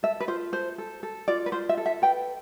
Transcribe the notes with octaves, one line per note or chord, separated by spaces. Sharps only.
A4 E5
B4
F4 C5
A4 C5
A4
A4
F4 D5
B4
F4 C5
E5
A4
E5
B4 G5